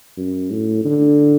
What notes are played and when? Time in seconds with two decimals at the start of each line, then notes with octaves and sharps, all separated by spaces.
0.17 F#2
0.51 A2
0.85 D3